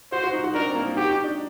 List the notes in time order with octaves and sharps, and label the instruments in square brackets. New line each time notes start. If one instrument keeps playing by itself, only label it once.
[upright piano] F#4 [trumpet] C5
[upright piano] F#4
D#4
F#4
[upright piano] D4 [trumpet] A#4
[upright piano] C4
A#3
D#4
[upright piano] F#4 [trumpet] G4
[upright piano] D#4
D4